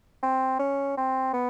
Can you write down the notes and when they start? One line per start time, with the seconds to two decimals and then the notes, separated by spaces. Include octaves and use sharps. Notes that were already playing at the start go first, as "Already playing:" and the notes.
0.23 C4
0.60 C#4
0.98 C4
1.34 B3